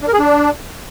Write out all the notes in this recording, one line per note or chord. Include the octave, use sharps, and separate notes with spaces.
D4
A#4
G#4
D4